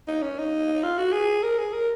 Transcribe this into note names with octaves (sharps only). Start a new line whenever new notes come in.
D#4
C#4
D#4
F4
F#4
G#4
A#4
G#4
A#4